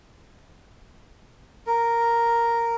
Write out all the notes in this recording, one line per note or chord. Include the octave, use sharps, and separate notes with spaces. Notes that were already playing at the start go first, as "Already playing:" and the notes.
A#4